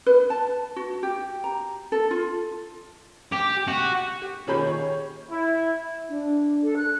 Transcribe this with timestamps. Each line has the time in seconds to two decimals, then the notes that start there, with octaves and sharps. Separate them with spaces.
0.06 B4
0.30 A5
0.76 F#4
1.03 G4
1.44 A#5
1.92 A4
2.11 F4
3.32 G4
3.67 F#4
4.22 G4
4.47 A#2 D#3 C#4 G#4 B5 G6
4.67 C#5
5.29 E4
6.09 D4
6.63 A4
6.77 F#6